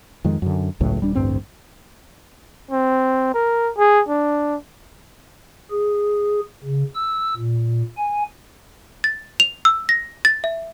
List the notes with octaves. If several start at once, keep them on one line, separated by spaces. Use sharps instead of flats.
F2 D#3 G#3
F#2 D3
G#1 C#2 A2 F#3
D#1 G3 D4
A1 D2 G2 C4
C4
A#4
G#4
D4
G#4
C#3
E6
A#2
G#5
A6
F7
E6
A#6
A6
E5